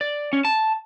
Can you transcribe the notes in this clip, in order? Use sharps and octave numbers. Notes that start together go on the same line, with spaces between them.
D5
C#4
A5